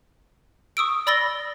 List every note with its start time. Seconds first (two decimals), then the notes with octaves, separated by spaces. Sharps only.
0.77 C#6 D#6 E6 D7
1.07 D5 B5 E6 A6 A#6 G7